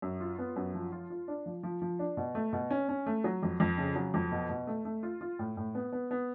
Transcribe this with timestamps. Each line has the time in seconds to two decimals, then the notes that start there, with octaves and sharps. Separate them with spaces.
0.02 F#2
0.21 F4
0.39 B3
0.56 F#2
0.74 F3
0.92 F4
1.10 F4
1.28 D4
1.46 F3
1.63 F3
1.82 F3
1.99 D4
2.17 B2
2.35 A3
2.53 B2
2.71 C#4
2.89 C#4
3.06 A3
3.24 F#3
3.43 F2
3.60 F2
3.78 C#3
3.96 F#3
4.14 F2
4.32 B2
4.50 B2
4.67 A3
4.85 A3
5.03 F4
5.21 F4
5.39 A2
5.57 A2
5.75 B3
5.93 B3
6.11 B3